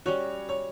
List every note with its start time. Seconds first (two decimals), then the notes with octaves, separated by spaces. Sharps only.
0.06 G3 C#4 F#4 C#5
0.49 C#5